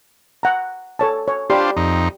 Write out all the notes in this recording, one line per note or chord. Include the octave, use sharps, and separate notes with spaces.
F#5 A#5
A4 C#5 A5
C#5
D4 F4 G4 C5 D5 B5
F2 D#4